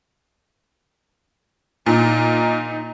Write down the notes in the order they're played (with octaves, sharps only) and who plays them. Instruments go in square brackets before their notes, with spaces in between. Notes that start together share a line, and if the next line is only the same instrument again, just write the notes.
[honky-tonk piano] A#2 [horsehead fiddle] D#4